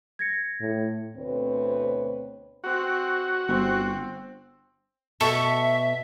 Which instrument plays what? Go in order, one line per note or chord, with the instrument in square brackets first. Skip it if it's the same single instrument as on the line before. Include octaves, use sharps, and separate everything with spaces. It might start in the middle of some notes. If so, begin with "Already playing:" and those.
[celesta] G#6 A#6 C#7
[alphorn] A2
[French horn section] D2 B2 C4 B4 C#5
[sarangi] C4 [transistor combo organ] F#4
[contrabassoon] G1 [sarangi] C4
[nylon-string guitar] B2 A3 B3 [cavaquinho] A4 C#6 [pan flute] E5